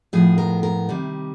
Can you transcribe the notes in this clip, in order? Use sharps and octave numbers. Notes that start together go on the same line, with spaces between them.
A2 F3 G#3 B3 G#4
A#4
A#4
C3 D#3 G3